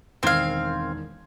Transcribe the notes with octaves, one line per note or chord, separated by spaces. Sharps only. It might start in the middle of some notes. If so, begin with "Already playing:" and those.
E1 D#3 C4 F5 G#6